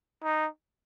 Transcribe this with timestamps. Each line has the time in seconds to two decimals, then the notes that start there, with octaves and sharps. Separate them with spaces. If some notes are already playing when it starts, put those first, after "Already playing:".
0.24 D#4